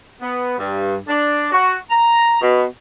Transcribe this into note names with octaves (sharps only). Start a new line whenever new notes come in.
B3
G2
D4
F#4
A#5
B2